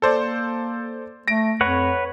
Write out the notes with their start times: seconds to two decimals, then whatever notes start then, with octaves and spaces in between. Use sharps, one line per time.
0.02 A#3 A4 C5 D5
1.28 A3 A#6 D7
1.61 F2 B4 C#5 F#5